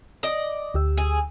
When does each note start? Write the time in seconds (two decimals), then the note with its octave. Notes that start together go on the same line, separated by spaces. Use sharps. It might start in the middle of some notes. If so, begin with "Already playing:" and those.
0.23 D5 D#5
0.74 D2 G4 E6
0.97 G#4